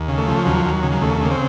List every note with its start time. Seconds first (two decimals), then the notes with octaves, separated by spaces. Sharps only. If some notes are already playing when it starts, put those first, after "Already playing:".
Already playing: D#2
0.08 C#3
0.18 A3
0.27 F3
0.46 D#2 F#3
0.65 D#2
0.83 C#3
0.92 F#3
1.02 D#2 A3
1.21 C#3 A#3
1.31 C4